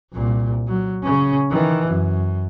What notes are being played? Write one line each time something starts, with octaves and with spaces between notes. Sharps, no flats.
C2 A#2
F#3
C#3 C#4
D#3 E3
F#2